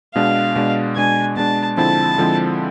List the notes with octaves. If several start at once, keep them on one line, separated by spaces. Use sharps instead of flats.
B2 G#3 D4 F5
B2 G#3 D4
B2 G#3 D4 G#5
B2 G#3 D4 A5
D3 F3 G#3 C4 E4 A5
D3 F3 G#3 C4 E4